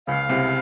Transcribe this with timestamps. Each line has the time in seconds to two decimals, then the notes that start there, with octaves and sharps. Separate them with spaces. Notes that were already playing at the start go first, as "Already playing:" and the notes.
0.07 C#2 C#3 F5
0.29 C2 C3